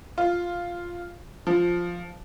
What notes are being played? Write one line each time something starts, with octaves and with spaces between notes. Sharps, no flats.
F4
F3